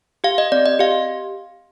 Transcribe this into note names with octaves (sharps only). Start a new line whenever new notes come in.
G4 F5
D#5
C4 D5
D#5
G4 F5